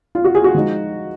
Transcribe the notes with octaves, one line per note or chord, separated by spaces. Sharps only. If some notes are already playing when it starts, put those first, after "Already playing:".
F4
F#4
G#4
F#4
F3 G#3 D#4